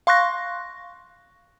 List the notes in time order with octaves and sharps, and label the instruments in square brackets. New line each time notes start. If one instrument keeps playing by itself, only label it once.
[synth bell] F5 C6 C#6 F#6 A#6